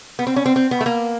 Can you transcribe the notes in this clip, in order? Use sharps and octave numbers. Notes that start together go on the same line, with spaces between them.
B3
C4
C#4
C4
C4
B3
A3
A#3